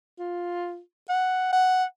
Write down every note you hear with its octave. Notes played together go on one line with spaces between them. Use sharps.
F4
F#5
F#5